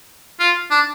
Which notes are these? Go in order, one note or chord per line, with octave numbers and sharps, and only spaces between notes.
F4
D4